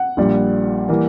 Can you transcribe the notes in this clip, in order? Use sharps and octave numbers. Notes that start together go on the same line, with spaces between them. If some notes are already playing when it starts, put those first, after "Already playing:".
Already playing: F#5
A#1 A#2 G3
E3 G3 A#3